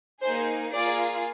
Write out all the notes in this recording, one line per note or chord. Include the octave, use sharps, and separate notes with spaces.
A#3 D#4 G#4 C5
A#3 F4 G#4 D5